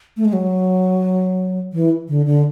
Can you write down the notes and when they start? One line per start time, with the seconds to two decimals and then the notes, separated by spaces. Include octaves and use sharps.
0.17 A3
0.25 G#3
0.33 F#3
1.73 E3
2.08 D3
2.26 D3